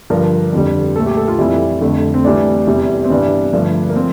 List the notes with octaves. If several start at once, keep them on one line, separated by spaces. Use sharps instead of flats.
G2 D3 F3 A#4
F2 D3 G3
A#2 A3 A4
G4
A4
F4
F2 E3 G3 E4
F2 D3 A3
C4
A2 E3 G3 D4
E2 C3 G3
C4
G2 E3 G3 D4
G2 D3 F3 A3
A#3
F3 C4